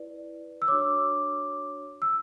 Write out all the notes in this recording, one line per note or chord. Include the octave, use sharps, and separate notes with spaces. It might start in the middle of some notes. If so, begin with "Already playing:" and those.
Already playing: E4 B4 D5
E6
D4 F#4 C#5 D6
E6